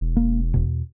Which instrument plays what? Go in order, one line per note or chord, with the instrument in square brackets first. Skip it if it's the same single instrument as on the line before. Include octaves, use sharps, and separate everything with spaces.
[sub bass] E1
[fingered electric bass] A#3
E2 B2